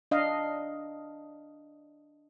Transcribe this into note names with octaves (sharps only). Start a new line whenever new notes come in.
D4 D#5 F5